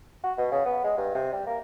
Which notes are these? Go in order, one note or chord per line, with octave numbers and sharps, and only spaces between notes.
F#4
B2
C#3
B3
G#3
G2
C3
G3
A#3